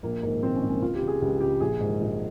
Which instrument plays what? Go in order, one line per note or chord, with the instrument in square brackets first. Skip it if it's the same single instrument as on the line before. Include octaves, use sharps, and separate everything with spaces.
[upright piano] A#1 A#3
G#2 D#3 A#3
A#1 C4
C#4
G#2 D#3
C#4
C#2 F4
G4
C#3
G#4
C#2 G4
C#3 G4
A#1 G#4
G#2 D#3
A#1